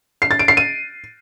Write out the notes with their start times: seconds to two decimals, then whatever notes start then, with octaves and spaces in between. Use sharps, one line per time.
0.22 C7
0.31 A6
0.39 D7
0.48 C7
0.57 D#7